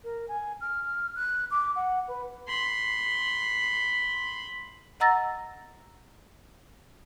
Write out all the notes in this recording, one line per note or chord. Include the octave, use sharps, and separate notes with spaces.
A#4
G#5
F6
F#6
D6
F#5
B4
B5 C6
D#5 F#5 A#5 E6 A6 A#6